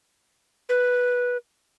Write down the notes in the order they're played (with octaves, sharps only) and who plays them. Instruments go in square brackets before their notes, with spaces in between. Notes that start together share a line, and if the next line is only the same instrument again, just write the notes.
[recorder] B4